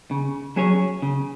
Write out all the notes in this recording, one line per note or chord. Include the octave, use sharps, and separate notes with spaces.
C#3
F#3 C#4 G#4 C#5
C#3